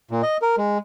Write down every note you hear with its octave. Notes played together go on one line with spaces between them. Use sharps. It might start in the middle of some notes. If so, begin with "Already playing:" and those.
A#2
D#5
A#4
G#3